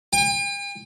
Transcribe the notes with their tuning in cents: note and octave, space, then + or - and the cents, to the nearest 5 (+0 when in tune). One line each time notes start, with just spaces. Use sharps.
G5 +45